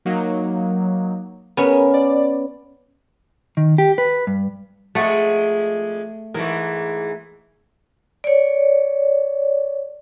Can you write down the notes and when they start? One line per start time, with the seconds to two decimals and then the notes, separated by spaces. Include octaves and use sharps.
0.05 F#3 A#3 D#4
1.57 B3 C#4 A#4
1.94 D5
3.57 D#3
3.78 G4
3.98 B4
4.27 G2
4.95 F2 G#3 A3 F#5
6.34 G#2 E3 A3 A#4
8.24 C#5 D5